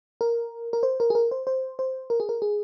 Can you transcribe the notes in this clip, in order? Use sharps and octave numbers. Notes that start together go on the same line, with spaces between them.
A#4
A#4
C5
A#4
G#4
A#4
C5
C5
C5
A#4
G#4
A#4
G#4